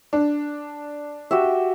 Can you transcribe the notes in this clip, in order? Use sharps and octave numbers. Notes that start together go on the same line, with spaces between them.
D4
F#4 G4 E5